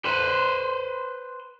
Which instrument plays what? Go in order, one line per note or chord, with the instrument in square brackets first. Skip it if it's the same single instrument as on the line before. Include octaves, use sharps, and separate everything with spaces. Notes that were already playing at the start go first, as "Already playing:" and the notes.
[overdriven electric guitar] B4 C5